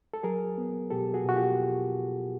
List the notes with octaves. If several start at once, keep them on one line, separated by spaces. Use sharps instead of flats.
A4
F#3 G#4 A#4
B3
B2 G4 A4
F#4 G#4
B2 F#4
F4 G4